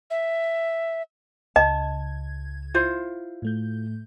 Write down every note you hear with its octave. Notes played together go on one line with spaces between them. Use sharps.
E5
C#2 C#3 D#5 A5 G#6
E4 F4 C5
A2 A3 G6